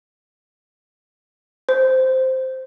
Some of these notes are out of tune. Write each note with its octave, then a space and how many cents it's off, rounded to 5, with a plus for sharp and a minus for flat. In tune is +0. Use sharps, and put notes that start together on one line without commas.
C5 -5